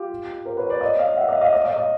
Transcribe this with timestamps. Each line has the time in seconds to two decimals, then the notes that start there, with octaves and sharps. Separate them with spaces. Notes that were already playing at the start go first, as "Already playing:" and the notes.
Already playing: F4 G4
0.45 A#4 C5
0.57 B4 C#5
0.69 C5 D5
0.81 C#5 D#5
0.99 D#5 F5
1.17 E5 F#5
1.29 D#5 F5
1.41 D#5 F5
1.53 C#5 D#5
1.64 D#5 F5
1.76 D#5 F5